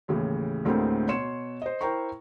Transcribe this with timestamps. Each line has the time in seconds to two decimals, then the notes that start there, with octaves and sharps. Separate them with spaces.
0.08 D#2 A2 C#3 E3
0.65 D2 A2 D3 G#3 A#3 C4
1.08 B2 C#5 C6 C#7 E7
1.62 C5 D#5
1.81 E4 A#4 C5 G5 A#5 C#6